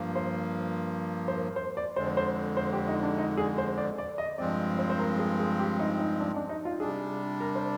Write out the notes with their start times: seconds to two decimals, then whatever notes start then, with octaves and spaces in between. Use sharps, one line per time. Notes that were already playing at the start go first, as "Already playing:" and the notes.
Already playing: G2 F3 A#3
0.15 C5
1.28 C5
1.36 A#4
1.56 C5
1.77 D5
1.96 F2 D3 G#3 C5
2.17 C5
2.57 C5
2.72 G4
2.88 D#4
3.03 D4
3.18 D#4
3.37 G#4
3.58 C5
3.78 D5
3.98 D5
4.18 D#5
4.38 G2 F3 G#3 C4 D5
4.79 C5
4.90 C5
4.99 A#4
5.19 G#4
5.39 G#4
5.59 G4
5.79 D#4
5.99 D#4
6.20 D4
6.35 D4
6.49 D#4
6.65 F4
6.80 C3 G3 D4 G#4
7.40 A#4
7.55 C5